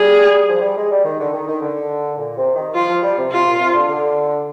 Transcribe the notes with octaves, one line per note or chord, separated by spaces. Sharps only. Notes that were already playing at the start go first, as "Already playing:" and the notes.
Already playing: G3 G#4
F3
G3
G#3
G3
D#3
D3
D#3
D#3
D3
A#2
C3
D#3
F3 F4
F3
G3
C3
C3 F4
A#2
C3
D3
D3